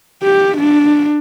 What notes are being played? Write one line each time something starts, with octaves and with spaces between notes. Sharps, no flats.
G4
D4